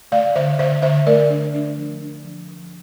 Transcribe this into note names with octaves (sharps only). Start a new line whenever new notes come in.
A3 D5 F5
D3 C5 E5
D3 C5 E5
D3 C5 E5
A3 A#4 D5
D4
D4
F3
D4
F3
F3